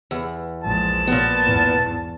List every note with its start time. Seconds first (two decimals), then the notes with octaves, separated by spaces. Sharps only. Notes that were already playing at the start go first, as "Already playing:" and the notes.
0.11 E2
0.64 A#1 G#3 A5
1.07 A#2 B3
1.45 E2 G#2